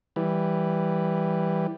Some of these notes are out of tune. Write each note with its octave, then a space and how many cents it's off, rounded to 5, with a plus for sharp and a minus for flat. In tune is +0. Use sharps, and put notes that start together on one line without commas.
E3 +0 G3 +0